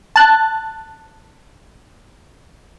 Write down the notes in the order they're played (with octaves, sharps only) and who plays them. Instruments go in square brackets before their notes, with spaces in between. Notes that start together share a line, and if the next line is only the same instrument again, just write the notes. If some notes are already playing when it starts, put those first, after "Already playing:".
[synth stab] A5 F#6